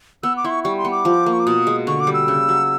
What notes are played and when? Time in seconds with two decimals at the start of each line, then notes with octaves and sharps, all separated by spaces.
0.23 B3 E6
0.37 D6
0.44 E4 C6
0.51 C#6
0.64 G3 C#6
0.78 C6
0.85 B3
0.92 D6
1.05 F3
1.26 A#3
1.33 C#6
1.40 D6
1.47 B2 D#6
1.67 G#3
1.87 D3 C#6
2.00 D6
2.07 G3
2.14 E6
2.28 C#3
2.49 F#3